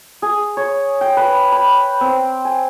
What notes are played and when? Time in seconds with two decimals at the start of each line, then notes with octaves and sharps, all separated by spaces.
0.22 G#4
0.57 C#5
1.01 G5
1.17 B4
1.52 B5
2.01 C4
2.45 G#5